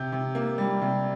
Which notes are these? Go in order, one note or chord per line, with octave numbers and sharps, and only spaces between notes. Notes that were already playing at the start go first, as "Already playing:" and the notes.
Already playing: C3 G6
C3
A#3
G3
C3